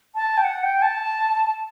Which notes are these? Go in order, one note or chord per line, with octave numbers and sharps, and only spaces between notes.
A5
G5
F#5
G5
A5